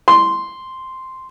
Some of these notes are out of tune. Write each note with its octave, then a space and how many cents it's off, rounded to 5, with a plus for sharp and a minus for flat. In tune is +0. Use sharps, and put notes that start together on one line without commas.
C6 -5